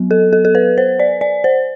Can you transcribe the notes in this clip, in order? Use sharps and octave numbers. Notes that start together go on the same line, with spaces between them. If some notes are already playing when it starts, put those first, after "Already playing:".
Already playing: F#3 B3
A4
A4
A4
B4
C5
D5
D5
C5